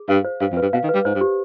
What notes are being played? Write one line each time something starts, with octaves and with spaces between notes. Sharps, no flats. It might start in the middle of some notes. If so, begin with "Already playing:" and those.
Already playing: G#4
G2 F5
C5
G2 F5
F2
G2 B4
B2 F5
D#3
B4
G3
G#2 C5
G2
G4